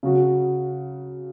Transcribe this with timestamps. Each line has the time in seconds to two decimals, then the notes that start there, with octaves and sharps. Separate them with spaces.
0.03 C#3 F#3 C#4 F#4